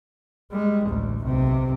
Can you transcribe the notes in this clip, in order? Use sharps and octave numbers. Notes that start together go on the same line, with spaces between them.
G3 G#3
A1 D2
B1 C3